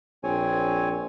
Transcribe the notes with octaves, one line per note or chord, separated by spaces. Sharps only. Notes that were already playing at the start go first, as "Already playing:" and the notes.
A#1 C4 C#5 G#5